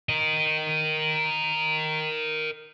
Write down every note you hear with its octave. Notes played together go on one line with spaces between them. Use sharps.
A#4 D#5